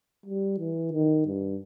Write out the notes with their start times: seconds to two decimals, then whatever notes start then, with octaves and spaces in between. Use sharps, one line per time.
0.26 G3
0.59 E3
0.92 D#3
1.26 G2